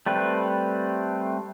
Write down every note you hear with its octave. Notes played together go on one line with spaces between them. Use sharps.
G3 A3 C4 B4